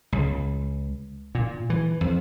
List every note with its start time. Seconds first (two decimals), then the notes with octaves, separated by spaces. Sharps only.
0.12 C#2
1.35 A#2
1.70 E3
2.01 F2